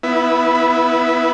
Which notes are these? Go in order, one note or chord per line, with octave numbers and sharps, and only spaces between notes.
B3 E4